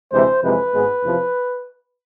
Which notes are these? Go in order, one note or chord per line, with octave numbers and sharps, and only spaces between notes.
D2 C3 E3 G#3 C5
F2 C3 E3 G#3 B4
G#1 G#2 G#3 B3
E2 C3 F3